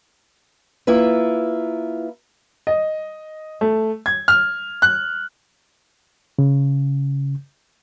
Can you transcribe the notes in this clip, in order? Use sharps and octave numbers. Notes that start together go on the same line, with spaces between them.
A#3 E4 F4 B4
D#5
A3
G#6
F6
F#6
C#3